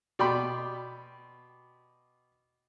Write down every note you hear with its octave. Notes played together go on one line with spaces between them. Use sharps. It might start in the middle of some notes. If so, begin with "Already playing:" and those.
B2 D5 G5 B5 C6